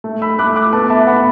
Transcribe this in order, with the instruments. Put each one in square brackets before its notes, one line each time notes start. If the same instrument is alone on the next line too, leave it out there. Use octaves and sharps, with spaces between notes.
[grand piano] A3
B5 E6
A3 D6 F#6
D6 F#6
B3 A5 D6
E5 A5
B3 F#5 B5